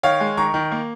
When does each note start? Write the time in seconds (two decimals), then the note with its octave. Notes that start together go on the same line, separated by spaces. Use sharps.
0.03 D#3 C#5 F5
0.20 G#3
0.37 D#3 A#5 C#6
0.54 D#3
0.72 A#3